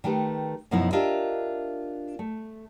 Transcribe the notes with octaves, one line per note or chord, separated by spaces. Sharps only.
D#3 A3 G4 B4
F#2 B2 F3 B3 D#4 E4
D4 F4 G4 A#4 D#5 E5
A3